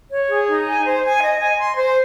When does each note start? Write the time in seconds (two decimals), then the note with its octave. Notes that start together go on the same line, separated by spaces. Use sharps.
0.11 C#5
0.30 G#4
0.48 D#4
0.67 G#5
0.85 C5
1.03 G#5
1.22 D#5
1.40 G#5
1.59 C6
1.77 C5